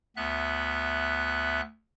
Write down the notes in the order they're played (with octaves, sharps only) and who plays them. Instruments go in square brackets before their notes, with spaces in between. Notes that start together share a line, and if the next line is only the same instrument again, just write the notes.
[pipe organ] D2 B3 E5 F#6